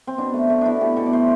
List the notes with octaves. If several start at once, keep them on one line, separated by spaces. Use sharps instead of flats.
C4
B2 D4
A3
A3
B2 D4 E4
A3 G4
B2 A4
D5
A3 C5